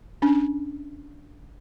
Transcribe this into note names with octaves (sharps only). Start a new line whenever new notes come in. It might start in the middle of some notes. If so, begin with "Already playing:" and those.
C#4 D4